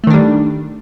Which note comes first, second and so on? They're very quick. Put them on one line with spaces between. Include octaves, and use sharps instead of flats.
A3 D#3 D4 G3